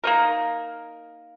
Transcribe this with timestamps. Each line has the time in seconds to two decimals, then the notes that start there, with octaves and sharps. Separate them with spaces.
0.04 A#3 D#4 A#4